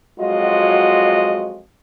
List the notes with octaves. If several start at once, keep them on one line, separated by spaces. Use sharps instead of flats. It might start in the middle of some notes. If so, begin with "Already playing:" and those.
F2 F#3 G#3 F4 F#4 D#5